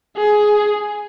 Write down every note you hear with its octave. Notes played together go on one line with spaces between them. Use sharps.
G#4